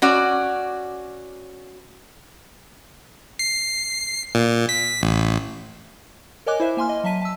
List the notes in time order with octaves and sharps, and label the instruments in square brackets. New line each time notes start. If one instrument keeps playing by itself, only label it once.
[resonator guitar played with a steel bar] C#4 F#4 D5
[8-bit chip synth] C7
A#2
B6
A1
[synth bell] A#4 C#5 D#5 G#5 D6 F#6
E4 C5 E5
A#3 G#5 C6 F6
D#5
F#3 E5 A5 B6 D#7
A5 E6